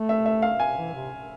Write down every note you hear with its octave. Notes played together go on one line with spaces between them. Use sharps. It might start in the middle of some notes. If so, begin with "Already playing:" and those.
Already playing: A3
E5
E5
F5
G#5
E3
C3